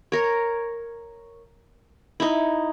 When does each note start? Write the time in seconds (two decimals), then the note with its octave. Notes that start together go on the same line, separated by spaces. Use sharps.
0.12 A#4 C#5
2.20 D#4 E4